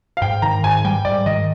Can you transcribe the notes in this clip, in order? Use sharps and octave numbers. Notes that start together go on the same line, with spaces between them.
F5
G#2 G5
D#3 A#5
G#2 G#5
G3 G5
G#2 D5
D#3 D#5